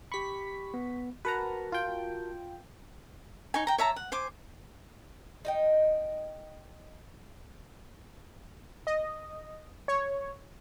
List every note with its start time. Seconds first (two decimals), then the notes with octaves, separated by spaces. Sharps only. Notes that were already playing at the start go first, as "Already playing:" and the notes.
0.12 G4 B5 C#6 B6
0.74 B3
1.25 F#4 A#4 B4 F#5 A5 A#5
1.72 F4 G5
3.54 D#4 C#5 G#5
3.67 G5 A#5
3.78 C#5 E5 A5 A#5
3.96 F#5
4.12 C5 G#5 D6
5.45 D#4 D#5 G5
8.87 D#5
9.88 C#5